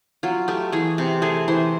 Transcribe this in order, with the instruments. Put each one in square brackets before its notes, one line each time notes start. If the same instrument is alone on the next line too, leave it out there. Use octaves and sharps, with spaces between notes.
[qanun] F#3 F4
A3 G4
E3 G#4
C3
A3 G#4
E3 C5